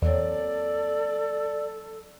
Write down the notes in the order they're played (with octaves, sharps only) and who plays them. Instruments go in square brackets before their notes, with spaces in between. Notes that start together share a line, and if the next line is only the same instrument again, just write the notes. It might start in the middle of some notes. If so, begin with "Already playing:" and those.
[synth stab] E2 [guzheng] F#3 A#3 C4 [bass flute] A4 [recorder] D5